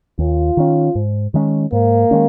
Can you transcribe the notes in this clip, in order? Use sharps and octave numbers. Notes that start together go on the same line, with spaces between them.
D#2 F4
D#3 C#4
G#2
D#3 G#3 C#4
G#2 A#3
D#3 G#3 C#4